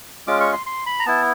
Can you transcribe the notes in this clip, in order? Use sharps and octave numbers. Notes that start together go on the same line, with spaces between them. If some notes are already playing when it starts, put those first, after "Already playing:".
G#3 C#4 F4 D6
C#6
C6
C6
B5
A#5
B3 E4 A5